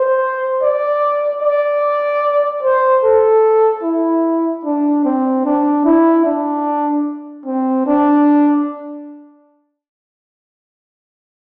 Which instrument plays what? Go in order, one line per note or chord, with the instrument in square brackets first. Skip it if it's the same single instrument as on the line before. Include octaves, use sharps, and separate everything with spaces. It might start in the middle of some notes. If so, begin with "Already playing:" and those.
Already playing: [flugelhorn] C5
D5
D5
C5
A4
E4
D4
C4
D4
E4
D4
C4
D4